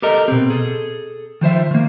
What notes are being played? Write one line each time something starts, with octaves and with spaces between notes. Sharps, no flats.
G4 A4 A#4 D#5
B2 C4
G#4 A4
D#3 F3 C5 E5
D#3 A#3